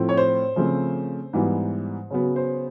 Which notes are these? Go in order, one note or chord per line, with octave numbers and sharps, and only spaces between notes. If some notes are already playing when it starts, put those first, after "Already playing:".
Already playing: A2 F3 A3 C4
C#5
C5
C#3 F3 A3 C4
G#2 E3 G3 B3
C#3 F#3 B3
C5